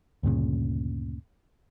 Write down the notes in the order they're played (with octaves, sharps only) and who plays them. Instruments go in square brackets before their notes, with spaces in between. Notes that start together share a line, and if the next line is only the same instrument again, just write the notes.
[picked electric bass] D2 G2 A#2 C#3